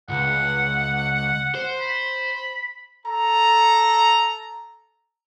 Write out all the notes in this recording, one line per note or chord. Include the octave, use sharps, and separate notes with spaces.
C#2 F#5
C5
B5
A4 A#5